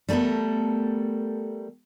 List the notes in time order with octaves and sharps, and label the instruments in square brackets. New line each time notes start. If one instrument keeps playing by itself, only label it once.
[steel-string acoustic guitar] G3 A3 B3 A4 A#4